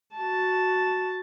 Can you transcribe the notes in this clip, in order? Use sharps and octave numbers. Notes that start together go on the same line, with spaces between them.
F#4 A5